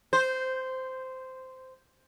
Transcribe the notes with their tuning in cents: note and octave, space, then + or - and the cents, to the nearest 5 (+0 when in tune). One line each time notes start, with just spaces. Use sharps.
C5 -10